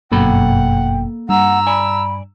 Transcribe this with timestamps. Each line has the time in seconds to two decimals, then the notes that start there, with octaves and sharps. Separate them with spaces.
0.12 G1 F#2 B2 A#3 A4 F#5 G5 B5
1.29 G2 F#5 A#5 E6
1.67 D5 G#5 B5